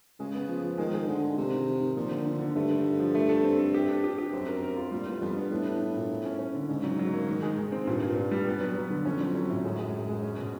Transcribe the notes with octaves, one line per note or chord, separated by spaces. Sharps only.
C#3 G#3
B3
F3
F3
D#3 G#3
G#3
D3 F3
G#3
C3 D#3
D#3
D#3
D#3
A#2 F3
D3
D3
D3
G2 A3
A3
A3
F3
A3
A4
C4
A4
G4
D4
G4
G4
F#2 C4
A#4
A#4
F4
A#2 G3
A2 B3
F2 G3
G2 B3
A2 D4
D4
D4
A#2
A#3
C#4
C#4
D3
G#2 C#3
F#3
F#3
A#3
D#3
G#3
D#3
C4
G2 A#2
A#2
A#2
G3
B3
F#3
F#3
D3
F2 C#4
F#3
F#3
A2
F#2 G#3
G#3
G#3
G#3
C#4
B2